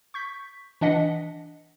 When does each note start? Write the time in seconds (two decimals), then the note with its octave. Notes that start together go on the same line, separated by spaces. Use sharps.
0.14 C#6 G6 B6
0.81 E3 D4 D#5 F#5 B6